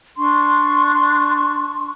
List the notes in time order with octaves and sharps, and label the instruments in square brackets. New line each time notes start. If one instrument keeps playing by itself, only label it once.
[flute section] D4 C6 C#6